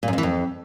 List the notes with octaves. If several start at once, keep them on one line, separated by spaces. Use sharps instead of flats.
A#2
F#2
F2
E3
F2